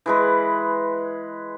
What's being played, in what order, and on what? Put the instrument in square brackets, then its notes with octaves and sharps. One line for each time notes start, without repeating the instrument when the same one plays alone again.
[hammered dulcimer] E3 G#3 B4